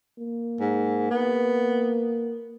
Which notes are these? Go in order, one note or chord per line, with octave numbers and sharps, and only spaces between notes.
A#3
G#2
B3